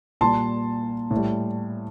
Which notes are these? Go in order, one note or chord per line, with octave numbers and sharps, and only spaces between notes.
A#2 G3 A5 C6
A2
G3